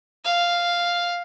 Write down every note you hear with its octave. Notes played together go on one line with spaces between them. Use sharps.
F5